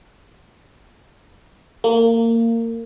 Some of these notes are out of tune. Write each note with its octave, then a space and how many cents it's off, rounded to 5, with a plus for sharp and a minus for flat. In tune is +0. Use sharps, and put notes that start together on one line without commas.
A#3 -25